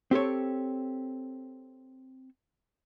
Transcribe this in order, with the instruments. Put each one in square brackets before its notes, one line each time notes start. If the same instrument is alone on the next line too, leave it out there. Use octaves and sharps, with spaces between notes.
[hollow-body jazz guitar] C4 G4 A4 C#5